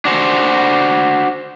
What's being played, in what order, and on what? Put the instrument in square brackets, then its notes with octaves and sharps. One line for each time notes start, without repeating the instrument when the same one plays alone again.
[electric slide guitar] D4 F#4 C5